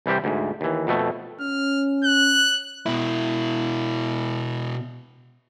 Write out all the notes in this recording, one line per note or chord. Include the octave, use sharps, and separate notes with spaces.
C2 E3 G3 G4 C5
D2 G#2
D#2 E3
F2 B2 A3
C#4 F6
F#6
B2 E4